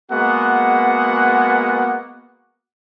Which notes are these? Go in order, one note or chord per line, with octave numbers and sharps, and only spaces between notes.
G#3 A#3 B3 F#4 F#5